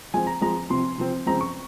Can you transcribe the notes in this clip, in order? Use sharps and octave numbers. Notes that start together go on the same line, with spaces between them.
F3 G#3 C4 G#5
A#5
F3 G#3 C4 A#5
C3 F3 C4 C6
C3 F3 C4
C#3 F3 G#3 C4 A#5
C#6